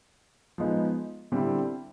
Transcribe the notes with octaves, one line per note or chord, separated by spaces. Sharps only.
F3 G#3 B3 D#4
D3 G3 C4 E4